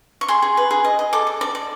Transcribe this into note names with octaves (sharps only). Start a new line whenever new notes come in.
C#6
G#4 C6
G#4
B4
G#4
D#5
D#5
A4 D6
D5
D5
D5